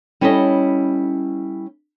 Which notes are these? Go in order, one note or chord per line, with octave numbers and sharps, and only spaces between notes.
G3 C#4 E4 A4 C#5 D#5